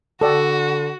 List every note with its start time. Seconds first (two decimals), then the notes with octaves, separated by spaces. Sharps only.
0.21 D3 F#4 A4 D5 G5